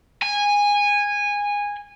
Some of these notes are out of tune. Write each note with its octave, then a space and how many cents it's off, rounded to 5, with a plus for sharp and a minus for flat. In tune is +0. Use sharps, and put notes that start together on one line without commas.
G#5 -15